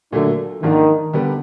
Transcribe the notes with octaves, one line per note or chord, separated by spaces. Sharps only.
A#2 D3 F#3 A3
G#2 D#3 F3 A#3 D4 F4
D3 G3 B3 D4 G4